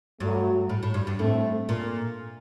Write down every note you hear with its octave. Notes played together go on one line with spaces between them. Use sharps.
G2 F#3 A3
A2
A2
G2
G2
A2 A3 C4
A#2